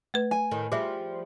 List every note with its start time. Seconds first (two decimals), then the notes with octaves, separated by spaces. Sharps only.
0.14 A3 B4
0.31 G#5
0.51 A2 D#3
0.72 F3 G3 G#4 C5 E5